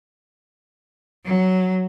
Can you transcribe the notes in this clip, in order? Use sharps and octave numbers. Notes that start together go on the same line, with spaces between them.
F#3